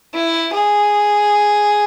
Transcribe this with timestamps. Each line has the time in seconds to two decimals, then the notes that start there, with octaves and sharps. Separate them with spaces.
0.14 E4
0.53 G#4